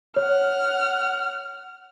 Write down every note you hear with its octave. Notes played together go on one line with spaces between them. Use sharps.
C#5 F#5 F6